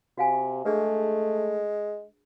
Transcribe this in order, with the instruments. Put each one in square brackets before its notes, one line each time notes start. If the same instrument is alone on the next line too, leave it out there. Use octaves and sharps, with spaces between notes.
[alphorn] C3 [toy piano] F#4 F5 G#5
[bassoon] G#3 [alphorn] A3 [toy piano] D4 G#4 B4